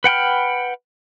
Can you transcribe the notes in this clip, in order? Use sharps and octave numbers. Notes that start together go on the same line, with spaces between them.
B4 F#5 G5 B5 F6